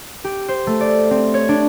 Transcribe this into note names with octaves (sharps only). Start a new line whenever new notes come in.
G4
C5
A3
D5
C4
C#5
D4